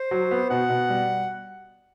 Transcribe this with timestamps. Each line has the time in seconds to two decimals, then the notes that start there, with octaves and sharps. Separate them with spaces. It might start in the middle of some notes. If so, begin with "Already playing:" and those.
Already playing: C5
0.11 F#3
0.31 B3
0.50 B2 F#5
0.70 B2
0.90 G3